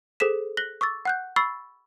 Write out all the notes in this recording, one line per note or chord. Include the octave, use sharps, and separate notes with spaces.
G#4 A4 C5 B6 E7
F#6 A#6 B6 F#7 G7
C#6 D6 E6 A6
F#5 F#6 G6
B5 C#6 E6 A6 C7